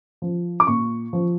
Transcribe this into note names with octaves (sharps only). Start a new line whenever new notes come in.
F3
D6
A#2 C#6
F3